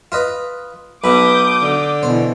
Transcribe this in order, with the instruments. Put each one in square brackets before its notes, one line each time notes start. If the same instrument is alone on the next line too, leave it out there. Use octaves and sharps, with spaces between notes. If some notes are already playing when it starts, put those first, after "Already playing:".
[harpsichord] F4 B4 D#5
[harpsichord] B1 B2 [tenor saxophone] B4 [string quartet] D6 D#6 G6
[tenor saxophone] D3
[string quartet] B2 E3 [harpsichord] C5